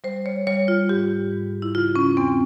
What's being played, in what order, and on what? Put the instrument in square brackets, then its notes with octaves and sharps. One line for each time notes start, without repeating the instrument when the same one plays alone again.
[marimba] G3 C5
C#5
G3 C#5
F4
G#2 G4
G#2
E4
C#3 F4
C#4
E2 C4